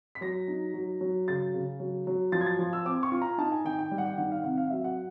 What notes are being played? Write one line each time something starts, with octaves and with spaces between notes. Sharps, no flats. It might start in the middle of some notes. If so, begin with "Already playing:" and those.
B6
F#3 A#6
D#4
F#3
F#3
C#3 A6
C#3
F#3
F#3
F3 A6
G#6
A6
F3
E6
C4 D6
C#6
F4
A#5
D#4 A5
G#5
D#3 G5
G5
G3
F#5
G5
D#3 F#5
F5
C3 F#5
F5
F#3 E5
F#5